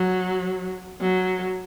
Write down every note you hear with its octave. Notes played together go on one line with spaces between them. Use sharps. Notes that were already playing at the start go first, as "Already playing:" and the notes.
Already playing: F#3
F#3